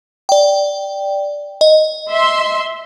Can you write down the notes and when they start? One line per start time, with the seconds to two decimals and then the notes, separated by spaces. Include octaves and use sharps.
0.29 D5 G5
1.61 D#5
2.11 E5 C6